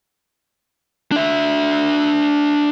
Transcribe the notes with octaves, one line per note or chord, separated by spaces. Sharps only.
D4 E5